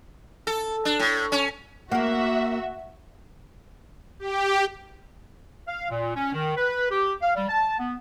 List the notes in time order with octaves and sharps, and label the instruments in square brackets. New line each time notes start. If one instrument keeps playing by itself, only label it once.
[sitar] A4
D4
A2
C#4
[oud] A#3 A#4 [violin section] F#4 E5 [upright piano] F#5
[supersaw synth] G4
[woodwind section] F5
A#2
C#4
D#3
B4
G4
F5
G3
A5
B3